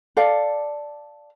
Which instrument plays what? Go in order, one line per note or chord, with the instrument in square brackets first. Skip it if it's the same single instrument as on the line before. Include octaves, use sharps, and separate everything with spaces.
[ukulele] A4 D5 F5